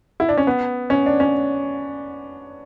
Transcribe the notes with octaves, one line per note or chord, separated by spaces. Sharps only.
E4
D4
C#4
B3
C#4
D4
C#4